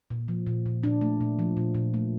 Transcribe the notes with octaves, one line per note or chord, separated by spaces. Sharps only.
A#2
F3
A#2
A#2
A#2 D4
A3
A#2
F3
A#2
A#2
A3